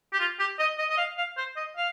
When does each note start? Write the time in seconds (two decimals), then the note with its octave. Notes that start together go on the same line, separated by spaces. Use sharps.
0.13 G4
0.19 F4
0.39 G4
0.59 D#5
0.78 D#5
0.90 D#5
0.98 F5
1.18 F5
1.37 C5
1.56 D#5
1.77 F5